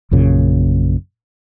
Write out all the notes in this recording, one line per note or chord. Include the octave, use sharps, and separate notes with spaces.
A#1 F#2 A#2 C#3